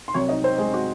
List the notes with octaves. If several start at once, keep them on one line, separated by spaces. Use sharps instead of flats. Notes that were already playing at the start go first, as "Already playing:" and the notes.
C6
C2 C3 F#3 C#5 C#6
D#4 D#5
C4 C5
G#3 G#4
F#4